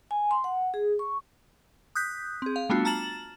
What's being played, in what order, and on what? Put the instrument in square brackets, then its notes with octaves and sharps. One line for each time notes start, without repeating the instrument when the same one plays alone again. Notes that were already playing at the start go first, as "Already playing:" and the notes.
[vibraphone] G#5
C6
F#5
G#4
C#6
[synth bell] D#6 F#6 G6 B6
C4 G#4
F5
G3 A3 B3 D4 F4 F#4
A5 A#5 F6 A6 E7 F#7